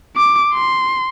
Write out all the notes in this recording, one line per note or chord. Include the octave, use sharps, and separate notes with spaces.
D6
C6